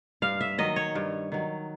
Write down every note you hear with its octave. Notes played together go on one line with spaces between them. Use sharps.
G2 F5
E5
D#3 F#3 D#5
C#5
G2
D#3 F#3